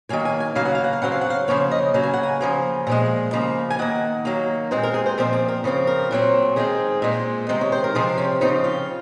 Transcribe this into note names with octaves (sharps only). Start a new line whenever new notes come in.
D#3 F#3 A#3 G#5
G#5
G#5
C#3 F#3 A#3 F5
F#5
F5
F#5
F5
C#3 F#3 C4 F#5
F5
F#5
F5
C#3 F3 A#3 C#5
D#5
C#3 F#3 A#3
G#5
F#5
G#5
C#3 F3 A#3
A#2 F3 G#3
C#3 F3 A#3
G#5
D#3 A#3 F#5
D#3 F#3 A#3
A#2 G#3 C4 C5
A#4
G#4
C5
A#2 F3 C4 A#4
G#4
A#4
C#3 F3 C4
A#4
A#2 F#3 C4
D#3 G#3 C4 G#4
A#2 G#3 C4
C3 D#3 G#3 C4
C#5
C5
A#4
C3 F3 C4 G#4
C#4
C#3 F3 C4 D#4
F4